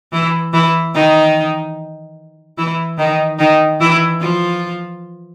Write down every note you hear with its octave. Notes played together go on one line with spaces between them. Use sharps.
E3 E4
E3 E4
D#3 D#4
E3 E4
D#3 D#4
D#3 D#4
E3 E4
F3 F4